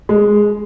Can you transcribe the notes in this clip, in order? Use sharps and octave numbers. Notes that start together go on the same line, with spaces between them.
G#3